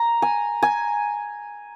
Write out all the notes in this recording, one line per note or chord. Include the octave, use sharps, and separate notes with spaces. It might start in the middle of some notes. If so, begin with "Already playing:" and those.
Already playing: A#5
G#5
G#5